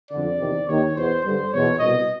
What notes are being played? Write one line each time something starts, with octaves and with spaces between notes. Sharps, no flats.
F2 D3 D5
E2 C3 D#3
D#2 D#3 C#5
E2 B2 C5
G2 D3 C5
E2 B2 C#5
C2 B2 D#5